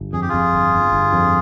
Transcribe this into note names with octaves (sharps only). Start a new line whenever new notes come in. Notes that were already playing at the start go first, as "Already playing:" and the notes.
Already playing: G1
F2 G#4
G4
F2 F4 G#4
G1
G1
G1
F2